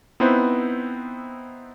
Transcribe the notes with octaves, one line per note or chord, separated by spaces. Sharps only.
B3 C4 D#4 E4 B4 C5